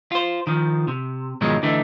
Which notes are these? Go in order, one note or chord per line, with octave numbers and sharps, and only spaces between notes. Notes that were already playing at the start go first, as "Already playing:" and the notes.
F4 C5
D#3 F3
C3
G#2 B2 D#3 F3 F#3 G#3
D3 E3 A3 D#4